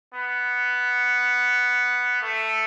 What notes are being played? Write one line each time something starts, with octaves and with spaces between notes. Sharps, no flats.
B3
A3